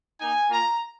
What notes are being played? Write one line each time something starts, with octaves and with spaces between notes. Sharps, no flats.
A#3 D#4 G#5
A#3 F4 A#5